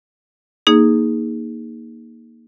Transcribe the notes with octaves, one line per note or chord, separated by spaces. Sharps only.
A#3 D#4 G#4